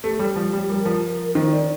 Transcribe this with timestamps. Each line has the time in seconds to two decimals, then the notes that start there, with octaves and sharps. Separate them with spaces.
0.04 A3 G4
0.19 G3
0.36 F3
0.53 G3
0.69 G3 A#4
0.85 F3
1.35 D#3 C5
1.51 D5